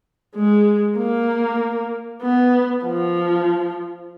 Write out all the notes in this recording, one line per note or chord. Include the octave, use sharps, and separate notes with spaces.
G#3
A#3
B3
F3